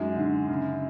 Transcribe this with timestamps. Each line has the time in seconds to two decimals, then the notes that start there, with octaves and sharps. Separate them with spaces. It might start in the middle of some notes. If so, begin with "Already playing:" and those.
Already playing: F#2 G#3 D#4
0.16 D3
0.49 C#3